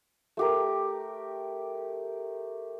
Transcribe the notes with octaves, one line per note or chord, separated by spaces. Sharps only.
A3 G4 A#4